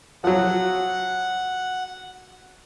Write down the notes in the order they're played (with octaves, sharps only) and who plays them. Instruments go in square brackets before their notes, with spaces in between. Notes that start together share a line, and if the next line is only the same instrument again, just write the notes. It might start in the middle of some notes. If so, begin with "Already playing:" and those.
[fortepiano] F3 F#3 [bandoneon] F#5